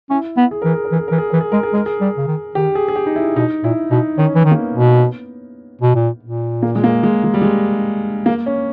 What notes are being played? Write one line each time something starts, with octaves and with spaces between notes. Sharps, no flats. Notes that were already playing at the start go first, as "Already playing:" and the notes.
C#4 E4
B3
G#4
E3 A#4
G#4
A#4
E3
G#4
E3 A#4
G#4
E3 A#4
G#4
G#3 A#4
G#4
G#3 A#4
G#4
G3
C#3
D#3
D#3 G4
G#4
G#4
G4
D#4
E4
B2 D#4
A#2 E4
B2 D#4
D#3 C#4
E3
D#3
A#3
B3
B2
B2
A#2
A#2
A#3
G#3
A#3
G#3
G#3
G3
G#3
A#3
C#4